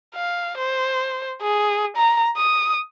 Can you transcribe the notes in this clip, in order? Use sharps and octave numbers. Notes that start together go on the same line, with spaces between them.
F5
C5
G#4
A#5
D#6